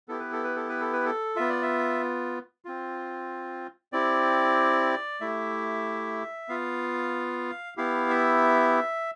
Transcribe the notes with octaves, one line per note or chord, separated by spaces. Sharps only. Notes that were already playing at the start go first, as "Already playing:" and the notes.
B3 E4 G4 A4
B4
A4
B4
A4
B4
A4
B4
A4
B3 F4 E5
D5
E5
C4 F4
C4 E4 G4 D5
A3 E4 G4 E5
B3 F4 F5
B3 E4 G4 F5
E5